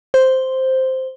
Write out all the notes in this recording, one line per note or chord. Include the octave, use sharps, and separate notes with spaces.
C5